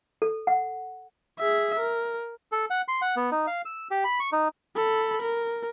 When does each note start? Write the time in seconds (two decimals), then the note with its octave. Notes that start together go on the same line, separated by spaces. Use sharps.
0.22 A4
0.47 F#5
1.39 G#4 E5
1.79 A#4
2.52 A4
2.70 F#5
2.88 C6
3.02 F#5
3.16 B3
3.31 D#4
3.47 F5
3.65 E6
3.91 G4
4.04 B5
4.20 C#6
4.32 D#4
4.76 A4 B5
5.22 A#4